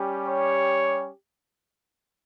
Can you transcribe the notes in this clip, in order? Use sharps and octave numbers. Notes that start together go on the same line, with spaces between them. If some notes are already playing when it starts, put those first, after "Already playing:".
Already playing: G3 C#4 G4
C#5